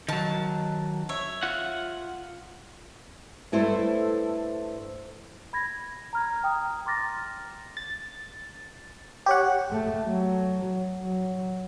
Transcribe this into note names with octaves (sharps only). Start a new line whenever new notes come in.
D#3 F#3 A5
C#5 E5
F4 F#5
G2 A3 E4 A4 C5
B5 G#6 A#6
A#5 F6 G#6
G5 A#5 D#6
A#5 C6 D6 F6 A6 A#6
A6
G4 C#5 F#5
A3
F#3
F#3